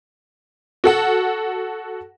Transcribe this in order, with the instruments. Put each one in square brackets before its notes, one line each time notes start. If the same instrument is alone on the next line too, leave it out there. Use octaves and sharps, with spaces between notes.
[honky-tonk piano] F#4 A4 F#5